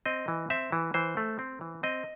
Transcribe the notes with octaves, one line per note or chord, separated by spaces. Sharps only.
C4 D#5
E3
C4 E5
E3
E3 C5
A3
C4
E3
C4 D#5